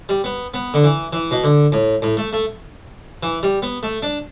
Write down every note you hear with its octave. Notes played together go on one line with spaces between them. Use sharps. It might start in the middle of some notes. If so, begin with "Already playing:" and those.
G3
B3
B3
D3
E3
E3
B2
D3
A2
A2
A3
A3
E3
G3
B3
A3
D4